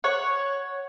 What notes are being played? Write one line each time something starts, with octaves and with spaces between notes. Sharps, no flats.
C#5 F#5